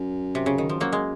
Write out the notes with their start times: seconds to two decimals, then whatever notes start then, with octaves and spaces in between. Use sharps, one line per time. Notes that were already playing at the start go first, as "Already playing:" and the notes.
Already playing: F#2
0.35 C3
0.46 C#3
0.58 D#3
0.69 F3
0.80 F#2 F#3 A#3
0.92 G#3